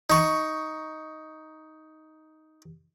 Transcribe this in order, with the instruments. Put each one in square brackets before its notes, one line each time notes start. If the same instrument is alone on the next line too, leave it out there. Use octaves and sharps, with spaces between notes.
[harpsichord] D#4 C#6